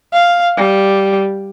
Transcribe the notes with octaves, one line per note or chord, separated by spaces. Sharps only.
F5
G3